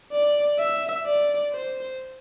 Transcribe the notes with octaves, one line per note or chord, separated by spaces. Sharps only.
D5
E5
D5
C5